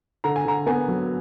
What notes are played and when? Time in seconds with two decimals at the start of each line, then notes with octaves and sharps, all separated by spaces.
0.24 D3 A#5
0.36 G#5
0.45 D3 A#5
0.67 B3 G#5
0.88 F#3